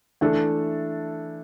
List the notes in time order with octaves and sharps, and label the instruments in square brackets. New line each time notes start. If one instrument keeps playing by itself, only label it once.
[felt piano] E3 A3 D4 A4